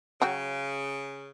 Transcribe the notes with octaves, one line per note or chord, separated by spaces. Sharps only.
C#3 F#3 F#4 G5